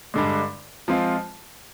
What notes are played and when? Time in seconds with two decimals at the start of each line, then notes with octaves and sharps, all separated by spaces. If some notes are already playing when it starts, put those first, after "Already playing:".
0.14 G2 D3 G#3
0.88 F3 G#3 C4 F4